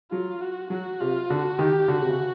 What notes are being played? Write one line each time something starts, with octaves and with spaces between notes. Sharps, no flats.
F#3 F4
F#4
F#3 F#4
C3 F4
D3 F#4
D#3 G4
D3 F#4
C3
C#3